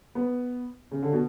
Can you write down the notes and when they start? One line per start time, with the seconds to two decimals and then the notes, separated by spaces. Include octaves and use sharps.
0.15 B3
0.91 C#3
1.02 D3
1.13 B2